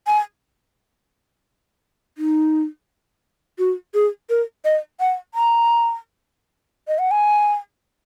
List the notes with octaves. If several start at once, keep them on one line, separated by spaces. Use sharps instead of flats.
G#5
D#4
F#4
G#4
A#4
D#5
F#5
A#5
D#5
F#5
G#5